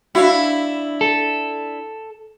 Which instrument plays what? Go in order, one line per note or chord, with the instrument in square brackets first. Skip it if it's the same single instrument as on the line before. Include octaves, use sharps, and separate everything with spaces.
[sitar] D4 E4 [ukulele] F#4 F5
[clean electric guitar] A4